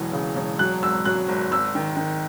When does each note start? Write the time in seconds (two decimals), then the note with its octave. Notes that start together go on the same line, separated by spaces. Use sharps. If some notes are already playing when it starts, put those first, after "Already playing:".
Already playing: E1 B1 E3
0.13 C#3
0.36 E1
0.59 F#3 F#6
0.82 G#1 E6
1.05 F#3 F#6
1.28 G#1
1.51 G#1 E6
1.75 D#3
1.97 D#3